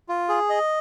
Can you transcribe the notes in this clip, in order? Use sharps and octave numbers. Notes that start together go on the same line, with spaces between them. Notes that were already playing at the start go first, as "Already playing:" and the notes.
F4
G#4
D#5